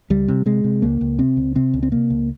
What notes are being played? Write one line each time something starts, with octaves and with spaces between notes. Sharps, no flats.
C#2 G3
C3
C3 G#3
C3
C#2 A#3
C#2
C3 C4
C#2
C3 C4
C#2
C4
C3 A#3
C#2